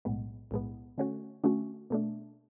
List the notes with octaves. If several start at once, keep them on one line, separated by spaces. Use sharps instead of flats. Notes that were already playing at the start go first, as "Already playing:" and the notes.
B1 A2 G#3 B3
B1 A2 G#3 B3
D3 A3 C#4 F#4
D3 A3 C#4 F#4
B2 A3 D4